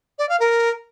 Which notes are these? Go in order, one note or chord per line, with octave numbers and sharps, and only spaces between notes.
D5
F5
A#4